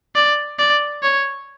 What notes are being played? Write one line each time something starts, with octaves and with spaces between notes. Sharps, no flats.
D5
D5
C#5